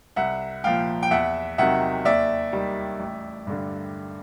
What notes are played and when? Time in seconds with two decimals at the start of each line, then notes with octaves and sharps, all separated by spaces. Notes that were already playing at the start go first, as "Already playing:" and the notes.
0.16 C2 E5 F#5
0.64 A#2 F3 F5 G5
1.03 G5
1.11 E2 E5 F#5
1.58 C3 D#3 F#3 E5 F#5
2.05 D#2 D5 E5
2.53 D#3 G3
2.99 A1
3.47 G2 D3